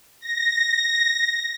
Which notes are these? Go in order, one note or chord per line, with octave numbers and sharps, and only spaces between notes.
A#6